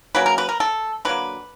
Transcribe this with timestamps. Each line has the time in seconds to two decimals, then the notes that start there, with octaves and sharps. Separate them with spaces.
0.15 C#3 F#3 A#3 B4
0.26 A#4
0.38 B4
0.49 A#4
0.60 A4
1.05 D3 F#3 A#3 B4